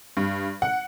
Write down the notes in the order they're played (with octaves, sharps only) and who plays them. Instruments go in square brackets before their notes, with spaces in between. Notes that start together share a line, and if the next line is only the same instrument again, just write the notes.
[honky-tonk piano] G2
F#5